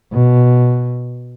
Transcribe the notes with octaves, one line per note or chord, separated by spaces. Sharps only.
B2